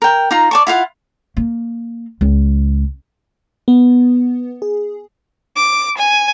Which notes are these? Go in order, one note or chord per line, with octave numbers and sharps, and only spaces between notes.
A#4 G5
D#4 F4 A#5
D5 A5 C#6
E4 F4 F5 F#5
A#3
C#2
B3
G#4
D6
G#5